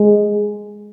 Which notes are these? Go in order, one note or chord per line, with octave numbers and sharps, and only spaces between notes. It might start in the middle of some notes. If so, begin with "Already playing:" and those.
Already playing: G#3